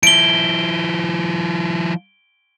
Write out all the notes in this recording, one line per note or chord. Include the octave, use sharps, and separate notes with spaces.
F3 E4 D7 G7